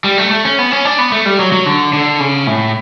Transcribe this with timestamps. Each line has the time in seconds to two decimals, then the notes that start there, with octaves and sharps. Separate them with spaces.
0.04 G3
0.18 A3
0.31 A3
0.45 C#4
0.59 B3
0.72 C#4
0.85 D4
0.99 B3
1.12 A3
1.26 G3
1.39 F#3
1.52 F#3
1.66 D3
1.93 D3
2.20 C#3
2.47 A2